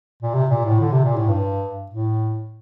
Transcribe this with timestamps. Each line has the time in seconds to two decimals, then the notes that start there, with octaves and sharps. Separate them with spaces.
0.23 A#2
0.34 C3
0.50 A#2
0.66 A2
0.80 D3
0.92 C3
1.04 A#2
1.16 A2
1.28 G2
1.92 A2